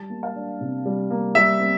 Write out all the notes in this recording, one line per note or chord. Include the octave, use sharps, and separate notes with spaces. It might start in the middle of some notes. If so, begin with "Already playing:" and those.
Already playing: G3 A5
A#3
F5
D4
C3
G3
A#3
G3 E5
C4